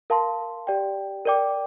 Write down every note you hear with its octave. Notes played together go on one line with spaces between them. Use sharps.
A#4 F5 A5 C6
G4 D5 G5
A#4 D5 G5 D6